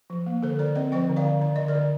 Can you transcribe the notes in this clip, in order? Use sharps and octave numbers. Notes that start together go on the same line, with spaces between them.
F3
A#3
D3 A4 C5
D3 A#4 D5
C4 C5 D#5
F3 D#5 G5
D3
D5 F5
D3
D3 D5
D3 D#5
A#4 D5
D3